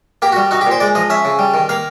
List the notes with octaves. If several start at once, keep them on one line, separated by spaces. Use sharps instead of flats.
A#3 G4
F#4
G3
D#4 F#4
G4
A#2
C5
G#3 D5
F3 D#5
C#4 E5
C#3
G3
D#3
A#3 F5